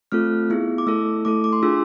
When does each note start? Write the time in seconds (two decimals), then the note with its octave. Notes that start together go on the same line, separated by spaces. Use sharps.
0.12 A3 C4 F4 A4 F6
0.50 B3 E4 G#4
0.78 D6
0.87 A3 E4 A4 E6
1.25 A3 E4 A4 D6
1.44 D6
1.53 C6
1.63 D4 F4 G#4 E6